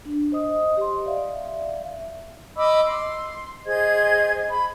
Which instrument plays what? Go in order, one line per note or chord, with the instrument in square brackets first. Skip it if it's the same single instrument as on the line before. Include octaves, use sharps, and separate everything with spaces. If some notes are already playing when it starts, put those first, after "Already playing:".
[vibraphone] D4
C5 D#5 D#6
G4 C6
D5 E5 F5
[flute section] D#5 B5 D6 E6
C6
G#4 C5 D#5 G#6
B5